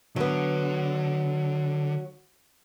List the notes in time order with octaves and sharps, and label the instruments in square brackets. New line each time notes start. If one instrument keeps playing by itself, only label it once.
[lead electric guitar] D3 [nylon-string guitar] F#3 B3